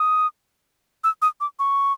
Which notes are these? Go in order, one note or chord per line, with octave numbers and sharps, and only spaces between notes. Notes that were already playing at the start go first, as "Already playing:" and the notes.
Already playing: D#6
E6
D#6
D6
C#6